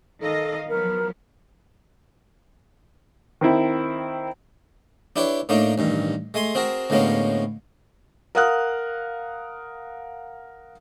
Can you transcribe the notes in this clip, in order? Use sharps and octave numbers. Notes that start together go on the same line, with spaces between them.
D#3 A4 D#5 F5
F3 F#3 B3 A#4
D#3 C4 E4
D4 E4 G4 B4 C#5
A2 A3 A#3 D4 D#4
A1 G2 D#3
G#3 A3 G#5 C6
C4 F#4 G#4 A#4
D2 A2 G#3 A#3 B3 C#4
A#4 F5 F#5 D#6 F6 F#6